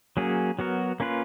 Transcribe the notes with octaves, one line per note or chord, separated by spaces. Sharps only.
F#3 A#3 C#4 G#4
F#3 B3 F#4 A#4
A#3 C#4 F4 B4